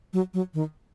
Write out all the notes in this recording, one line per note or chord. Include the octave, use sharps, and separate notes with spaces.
F#3
F#3
D#3